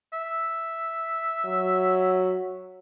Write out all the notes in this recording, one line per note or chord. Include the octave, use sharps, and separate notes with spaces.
E5
F#3